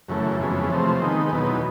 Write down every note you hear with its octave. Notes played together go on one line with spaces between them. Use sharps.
F#2 C#3 E3 A3
F2 C#3 E3 G#3 B3
C3 F3 A3 C4
D#3 G#3 B3 D#4
E2 B2 F#3 B3 D#4